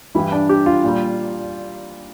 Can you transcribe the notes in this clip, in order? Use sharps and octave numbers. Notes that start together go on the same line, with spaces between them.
G2 E3 G3 E4
D4
G4
F4
A#2 G3